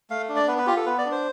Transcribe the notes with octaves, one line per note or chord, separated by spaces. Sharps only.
A3 F5
D4
D5
B3 B4
B4
F4 G4
A4
B3 B4
D5
D4
C5